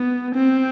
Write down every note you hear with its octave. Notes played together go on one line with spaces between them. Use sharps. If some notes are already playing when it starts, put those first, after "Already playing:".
Already playing: B3
C4